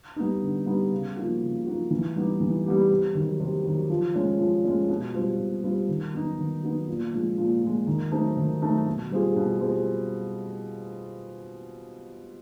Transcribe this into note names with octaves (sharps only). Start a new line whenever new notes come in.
G3 B3 D#4
D3
G3 B3 D#4
C#3
F3 A#3 D#4 F#4
C#3
F3 A#3 D#4 F#4
E3
G3 B3 D#4 G4
E3
G3 B3 D#4 G4
C3
D#3 F#3
C3
D#3 F#3
F3
G#3 C#4
F3
G#3 C#4
B2
G3 C4 F4
B2
G3 C4 F4
D#3
F#3 B3 D#4
D#3
F#3 B3 D#4
A#2
F3 G#3
A#2
F3 G#3
D#3
F#3 A3 C4 D#4
D#3
F#3 A3 C4 D#4
B2
G3 C4 F4 G#4
B2
G3 C4 F4 G#4